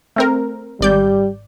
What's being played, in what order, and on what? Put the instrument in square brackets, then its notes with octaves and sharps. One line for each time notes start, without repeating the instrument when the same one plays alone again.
[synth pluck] A3 C4 A#4
[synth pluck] G#1 D5 G6 [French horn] G3